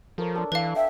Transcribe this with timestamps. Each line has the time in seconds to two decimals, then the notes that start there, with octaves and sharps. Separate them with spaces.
0.18 F3 A4 A#4 C#5
0.35 D4 A4
0.52 E3 B4 F5
0.76 E5 G5